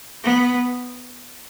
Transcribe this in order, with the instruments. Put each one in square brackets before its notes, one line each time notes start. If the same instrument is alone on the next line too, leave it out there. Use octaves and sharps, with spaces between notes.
[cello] B3